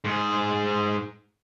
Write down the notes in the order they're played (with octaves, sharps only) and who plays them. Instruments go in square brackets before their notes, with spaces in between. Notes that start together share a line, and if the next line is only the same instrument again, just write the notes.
[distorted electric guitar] G#2 G#4